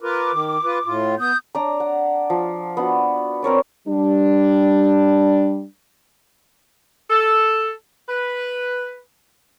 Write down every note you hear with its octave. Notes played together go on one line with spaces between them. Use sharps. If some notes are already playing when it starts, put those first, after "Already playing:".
F4 A#4 B4 D6
D#3
F4 B4
A2 F4
B3 D#6 G6
D4 D5 A#5
F#5
F3
B3 D4 F#4
C4 A#4 C#5 D5
G3 D4
A4
B4